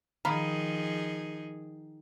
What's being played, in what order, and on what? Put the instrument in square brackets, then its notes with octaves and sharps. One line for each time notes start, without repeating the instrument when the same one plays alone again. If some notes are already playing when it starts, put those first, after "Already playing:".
[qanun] D#3 [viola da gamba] F3 D#4 G#4 [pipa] F5 A#5 B5